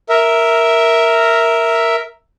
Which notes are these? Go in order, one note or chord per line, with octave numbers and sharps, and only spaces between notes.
A#4 E5